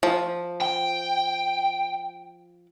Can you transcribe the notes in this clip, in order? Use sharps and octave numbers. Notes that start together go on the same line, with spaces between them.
F3
G5